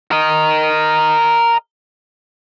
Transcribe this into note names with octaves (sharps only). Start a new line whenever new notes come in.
A#4 D#5